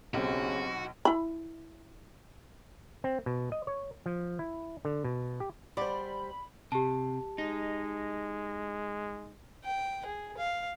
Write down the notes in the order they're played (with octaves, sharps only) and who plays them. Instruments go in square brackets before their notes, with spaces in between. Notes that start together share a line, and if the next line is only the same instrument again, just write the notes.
[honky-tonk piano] B1 [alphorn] C#3 [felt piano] C4 G4 [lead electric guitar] F#4
[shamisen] E4 B5
[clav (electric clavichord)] C4
B2
D#5
C#5
F3
E4
D3
B2
G4
[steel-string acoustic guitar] G3 C5 [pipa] G#3 F#4 D5 [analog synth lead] B5
[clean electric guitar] C3 [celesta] G4 A5
[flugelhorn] G#3 [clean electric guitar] D#4
[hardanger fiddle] G5
G#4
F5